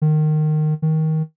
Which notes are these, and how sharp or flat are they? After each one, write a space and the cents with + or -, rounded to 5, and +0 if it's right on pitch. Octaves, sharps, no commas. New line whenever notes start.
D#3 -20
D#3 +20